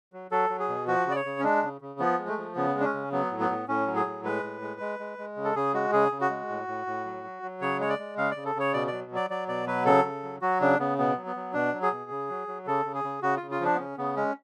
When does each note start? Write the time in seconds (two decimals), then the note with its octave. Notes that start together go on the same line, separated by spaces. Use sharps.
0.13 F#3
0.31 F#3 A4
0.50 F#3
0.59 G#4
0.69 B2
0.87 F3 F#4
1.06 C#3 D5
1.16 C#5
1.25 C#3
1.39 C#4
1.43 G#3 D4
1.63 C#3
1.81 C#3
1.99 F3 B3
2.19 G#3
2.28 A3
2.38 F3
2.56 C#3 B3
2.75 G#3
2.80 D4
2.84 C#4
2.93 C#3
3.12 F#3 B3
3.31 A2
3.40 B3
3.50 A2
3.68 A2 C#4
3.87 F#3
3.96 G#4
4.06 A2
4.24 G#3 B4
4.43 A2
4.62 G#3
4.80 G#3
4.99 G#3
5.18 G#3
5.37 C#3
5.45 A4
5.55 C#3 G#4
5.74 G#3 F#4
5.93 C#3 G#4
6.12 C#3
6.21 F#4
6.30 G#3
6.49 A2
6.68 A2
6.87 A2
7.05 F#3
7.24 F#3
7.43 F#3
7.61 C#3 C#5
7.80 G#3 C#5
7.89 D5
7.99 G#3
8.17 C#3 F5
8.31 C#3 D5
8.45 A4
8.55 C#3 C#5
8.73 B2 D5
8.87 F#3 D5
9.11 F#3 D5
9.30 F#3 D5
9.48 B2 D5
9.67 F#3 B4
9.86 C#3 A4
10.04 C#3
10.23 F#3
10.42 F#3 F#4
10.61 C#3 D4
10.79 C#3 B3
10.98 B2 B3
11.17 F#3
11.26 B3
11.36 F#3
11.54 B2 D4
11.74 F#3
11.82 G#4
11.92 B2
12.10 C#3
12.29 F#3
12.48 F#3
12.66 C#3 A4
12.85 C#3
12.95 G#4
13.04 C#3
13.22 C#3 F#4
13.37 C#3 F4
13.51 F4
13.60 F3 D4
13.75 B3
13.79 C#3 C#4
13.98 C#3 B3
14.16 G#3 C#4